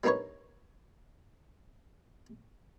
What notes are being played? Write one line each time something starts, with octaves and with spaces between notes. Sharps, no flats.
G3 A#3 D4 D#4 B4 C#5